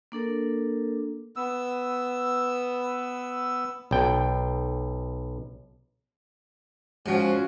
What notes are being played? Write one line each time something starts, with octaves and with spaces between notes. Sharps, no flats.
A#3 D4 A4 A#4
B3 E6
B1 G5
G#2 F3 C#4 F4 F#4